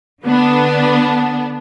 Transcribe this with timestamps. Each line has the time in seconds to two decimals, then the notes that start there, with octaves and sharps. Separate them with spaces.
0.24 D3 B3 D4